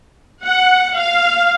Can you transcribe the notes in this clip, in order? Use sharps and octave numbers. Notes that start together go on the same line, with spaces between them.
F#5
F5